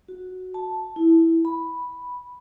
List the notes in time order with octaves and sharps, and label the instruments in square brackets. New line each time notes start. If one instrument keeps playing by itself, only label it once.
[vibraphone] F#4
A5
E4
B5